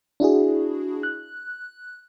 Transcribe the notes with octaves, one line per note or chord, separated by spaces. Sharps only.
D4 E4 F#4 G#4
F#6